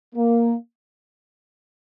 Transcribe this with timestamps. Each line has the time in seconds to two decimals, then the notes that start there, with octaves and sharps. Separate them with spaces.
0.15 A#3